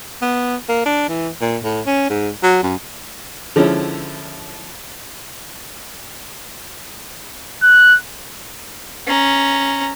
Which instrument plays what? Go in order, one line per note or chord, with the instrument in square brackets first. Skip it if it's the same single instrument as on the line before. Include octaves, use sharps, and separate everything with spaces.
[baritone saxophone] B3
A#3
D4
E3
A#2
A2
C#4
G#2
F#3
F#2
[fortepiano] D3 F3 G#3 C#4 E4
[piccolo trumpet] F#6
[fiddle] C#4 A#5